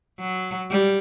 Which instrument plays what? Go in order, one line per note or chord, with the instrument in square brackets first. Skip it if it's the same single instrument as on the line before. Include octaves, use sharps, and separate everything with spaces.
[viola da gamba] F#3
G3